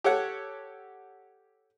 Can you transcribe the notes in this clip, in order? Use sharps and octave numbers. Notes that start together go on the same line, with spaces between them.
G4 A4 C#5 F#5